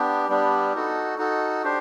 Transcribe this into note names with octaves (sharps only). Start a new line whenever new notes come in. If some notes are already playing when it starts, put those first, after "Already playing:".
Already playing: B3 D4 G4
G3 B3 D4 G4
D#4 F#4 A4
D#4 F#4 A4
D4 G4 C5